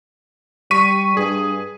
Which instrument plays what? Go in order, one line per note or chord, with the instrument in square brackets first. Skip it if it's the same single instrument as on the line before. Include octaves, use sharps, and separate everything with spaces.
[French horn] G3 [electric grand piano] C#6 B6 D#7
[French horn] G2 [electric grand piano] G#4